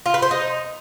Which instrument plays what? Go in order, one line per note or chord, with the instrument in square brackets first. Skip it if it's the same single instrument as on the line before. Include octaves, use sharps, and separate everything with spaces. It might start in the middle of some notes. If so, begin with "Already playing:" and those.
[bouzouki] F4
B4
C5
D#4